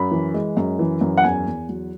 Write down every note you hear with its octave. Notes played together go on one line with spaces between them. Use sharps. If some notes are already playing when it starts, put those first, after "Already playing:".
Already playing: F#2 B5
E3
G#3
F#2
E3
F#2
F#5
E2 G#5
E2
F#3